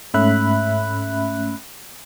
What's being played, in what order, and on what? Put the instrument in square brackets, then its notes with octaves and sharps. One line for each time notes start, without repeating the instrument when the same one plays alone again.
[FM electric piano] G#2 A3 C#4 E5 B5 F#6